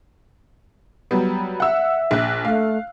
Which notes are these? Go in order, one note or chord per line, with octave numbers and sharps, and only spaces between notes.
F#3 G3 B3
E5 F#5 E6
A#1 F#6
A3 F5